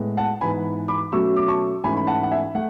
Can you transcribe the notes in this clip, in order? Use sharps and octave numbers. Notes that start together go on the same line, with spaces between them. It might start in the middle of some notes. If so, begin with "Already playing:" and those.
Already playing: A2 G#3 B3
F#5 A5
G#2 E3 B3 G#5 B5
B5 D6
B2 F#3 A3 C#4 C#6 E6
D6
A5 C#6
G#2 E3 A3 C#4 G#5 B5
B5
F#5 A5
F#5
E5 G#5
A3 F#5